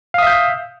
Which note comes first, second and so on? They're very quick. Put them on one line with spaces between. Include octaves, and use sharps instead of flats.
F5 D#6 E5 G6